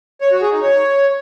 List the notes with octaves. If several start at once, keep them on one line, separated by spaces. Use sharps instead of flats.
C#5
F#4
G#4
D#4
C#5